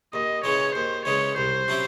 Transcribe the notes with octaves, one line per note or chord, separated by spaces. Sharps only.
D#2 D#5
C#3 E3 G#3 C#5
D#2 C5
C#3 E3 G#3 C#5
C2 C5
C3 F#3 C#4 E4